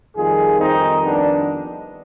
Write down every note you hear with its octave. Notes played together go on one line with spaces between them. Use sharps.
F2 D#3 G3 F4 G#4
C4 D#4
B3 D4